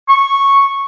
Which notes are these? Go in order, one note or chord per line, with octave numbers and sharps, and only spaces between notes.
C#6